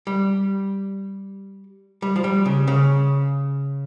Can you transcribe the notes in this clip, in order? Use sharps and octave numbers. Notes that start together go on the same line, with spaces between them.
G3
G3
F3
G3
C#3
C#3